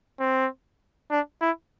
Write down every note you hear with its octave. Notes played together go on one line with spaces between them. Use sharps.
C4
D4
E4